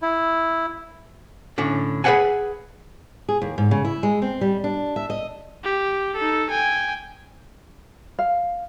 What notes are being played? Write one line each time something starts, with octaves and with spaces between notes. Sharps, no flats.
E4
A2 D3 C#4
G#4 B4 C5 F5 F#5 G#5
G#4
D#2
G#2
C#3
E4
G#3
C4
G3
D4
E5
D#5
G4
D#4 A4
G5 G#5
F5